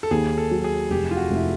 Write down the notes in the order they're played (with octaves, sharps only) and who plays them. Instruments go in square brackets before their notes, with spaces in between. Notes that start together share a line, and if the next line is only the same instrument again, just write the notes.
[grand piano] A4
[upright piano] D#2 [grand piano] G#4
[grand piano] A4
[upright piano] F#3
[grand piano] G#4
[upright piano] F1 [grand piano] G4
[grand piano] F4
F#4
[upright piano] F1 [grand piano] E4